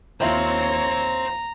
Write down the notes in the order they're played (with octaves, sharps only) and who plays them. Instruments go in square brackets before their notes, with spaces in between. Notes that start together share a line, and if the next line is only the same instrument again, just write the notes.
[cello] D#2 C#5 [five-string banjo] F3 E4 F4 [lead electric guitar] C5 G5 [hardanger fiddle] A#5